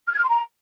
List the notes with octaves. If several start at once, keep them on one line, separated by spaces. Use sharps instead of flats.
F6
G#6
F6
C6
A#5